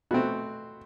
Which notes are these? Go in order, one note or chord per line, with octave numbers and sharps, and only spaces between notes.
B2 A3 C4 F#4